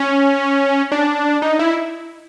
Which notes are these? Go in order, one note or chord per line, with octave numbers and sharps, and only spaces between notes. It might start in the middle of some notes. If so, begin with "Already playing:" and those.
Already playing: C#4
D4
D#4
E4